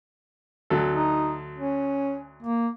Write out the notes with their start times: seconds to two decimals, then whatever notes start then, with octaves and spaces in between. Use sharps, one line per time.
0.70 D2 F#3 A4
0.92 D#4
1.59 C#4
2.43 A#3